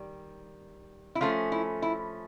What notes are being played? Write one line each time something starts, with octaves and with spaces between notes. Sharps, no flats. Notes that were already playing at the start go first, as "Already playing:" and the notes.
Already playing: D#3 G3
E4
F3 A3 C#4 F4
E4
E4